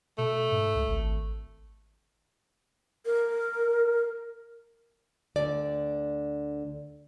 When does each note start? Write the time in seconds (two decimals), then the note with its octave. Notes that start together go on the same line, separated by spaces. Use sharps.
0.18 B2 A3
0.52 G#2
0.75 C#2
0.88 G#1
3.06 A#4
5.36 D2 D3 D5